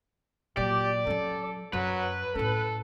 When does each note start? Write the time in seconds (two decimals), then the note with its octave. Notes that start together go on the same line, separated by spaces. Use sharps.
0.57 A#2 F#3 G4 D5
1.07 F#3 C#4 A4
1.73 F#2 F#3 B4
2.35 A2 C#4 A4